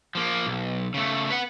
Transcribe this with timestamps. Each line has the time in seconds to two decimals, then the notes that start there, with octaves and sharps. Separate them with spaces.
0.15 F3 A#3
0.46 B1
0.94 C#3 A3
1.30 B4 F#5